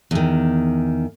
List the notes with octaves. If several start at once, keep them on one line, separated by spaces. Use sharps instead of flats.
E2 D#3